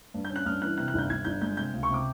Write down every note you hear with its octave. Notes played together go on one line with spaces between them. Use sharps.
G2
G6
C#4
F#6
G2 F6
E3 F#6
C3 F#6
F#6
G1 G6
G1 G#6
G1 G6
G#3 G6
C3 G6
C#2
C#6
C3 D6